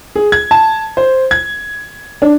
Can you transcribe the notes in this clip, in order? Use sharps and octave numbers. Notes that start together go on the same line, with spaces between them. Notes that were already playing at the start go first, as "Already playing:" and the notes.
G#4
G#6
A5
C5
G#6
D4